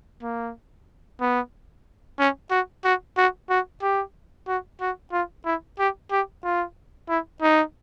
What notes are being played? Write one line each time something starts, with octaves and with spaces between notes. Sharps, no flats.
A#3
B3
C#4
F#4
F#4
F#4
F#4
G4
F#4
F#4
F4
E4
G4
G4
F4
E4
D#4